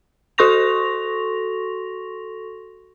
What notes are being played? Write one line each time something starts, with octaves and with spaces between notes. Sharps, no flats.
F#4 A4 C6 C#6 A#6 F7